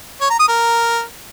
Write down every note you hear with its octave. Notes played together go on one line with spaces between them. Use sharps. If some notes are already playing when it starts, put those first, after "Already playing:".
C#5
A#5
D#6
A#4